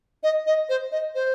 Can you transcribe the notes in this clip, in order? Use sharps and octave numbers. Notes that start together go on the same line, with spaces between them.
D#5
D#5
C5
D#5
C5